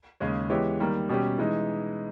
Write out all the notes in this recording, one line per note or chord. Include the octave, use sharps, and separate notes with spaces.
D#2 C#3 G#3 C#4 G#4
E3 G#3 B3 G4 C#5
D#3 G3 A#3
B2 G3 C#4 G4
E3 G#3 D#4